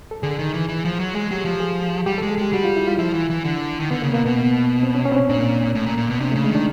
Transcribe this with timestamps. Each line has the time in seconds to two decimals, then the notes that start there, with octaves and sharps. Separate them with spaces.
0.11 A4
0.23 D3 G#4
0.39 D#3
0.54 E3
0.69 E3
0.85 F3
1.00 F#3
1.15 G#3 G#4
1.31 F#3 G4
1.45 F3
1.60 G#4
2.06 G3 G4
2.18 A4
2.22 G#3
2.30 G#4
2.38 G#3 G4
2.53 G3 F#4
2.64 F4
2.76 E4
2.87 F4
2.99 F3 E4
3.14 E3
3.30 E3
3.44 D3
3.80 D#3
3.91 D3 B3
4.02 C#3 A#3
4.14 B2 A#3
4.25 B2 B3
4.83 C4
4.95 C#4
5.05 C#4
5.12 C4
5.17 C#4
5.29 A#2 D4
5.75 A2
5.86 A#2
5.97 A#2
6.10 B2
6.20 C3 D4
6.32 A3
6.36 C#3
6.44 G#3
6.51 D#3 D4